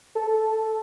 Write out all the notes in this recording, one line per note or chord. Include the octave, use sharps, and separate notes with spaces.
A4